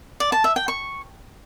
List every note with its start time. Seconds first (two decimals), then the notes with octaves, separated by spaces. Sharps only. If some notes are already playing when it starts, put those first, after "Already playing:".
0.20 D5
0.32 A5
0.44 E5
0.56 G5
0.68 C#6